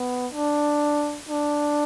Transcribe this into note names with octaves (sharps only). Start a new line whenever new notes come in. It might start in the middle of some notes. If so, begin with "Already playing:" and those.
Already playing: B3
D4
D4